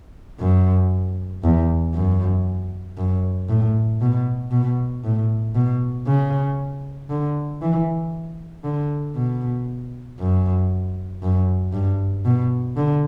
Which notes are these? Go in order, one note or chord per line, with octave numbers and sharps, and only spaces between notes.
F#2
E2
F#2
F#2
A2
B2
B2
A2
B2
C#3
D3
E3
D3
B2
F#2
F#2
G2
B2
D3